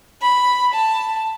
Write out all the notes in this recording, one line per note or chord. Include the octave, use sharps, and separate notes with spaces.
B5
A5